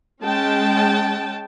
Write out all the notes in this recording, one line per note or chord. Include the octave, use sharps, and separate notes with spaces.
G#3 C#4 G5 A5